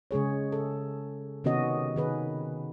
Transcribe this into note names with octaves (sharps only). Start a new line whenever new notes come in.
C#3 G#3 G#4 C#5
A4
C3 D#3 B3 C#4 F#4 D#5
D#3 G#4 B4